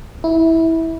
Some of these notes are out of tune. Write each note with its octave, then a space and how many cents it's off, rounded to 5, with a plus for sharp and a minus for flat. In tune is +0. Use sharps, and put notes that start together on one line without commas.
E4 -15